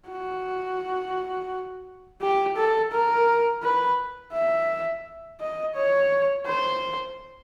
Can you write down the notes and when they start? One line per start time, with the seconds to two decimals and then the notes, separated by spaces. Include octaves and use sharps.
0.09 F#4
2.21 G4
2.57 A4
2.92 A#4
3.63 B4
4.34 E5
5.40 D#5
5.75 C#5
6.46 C5